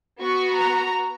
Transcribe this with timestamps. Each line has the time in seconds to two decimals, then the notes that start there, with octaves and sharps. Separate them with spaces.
0.19 B3 F#4 C#6
0.55 A#5